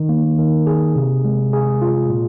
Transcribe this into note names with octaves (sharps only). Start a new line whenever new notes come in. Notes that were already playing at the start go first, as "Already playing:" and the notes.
Already playing: D#3 D#4
A#3
D#3
G#4
C3
G#3
G#4
F4
A#2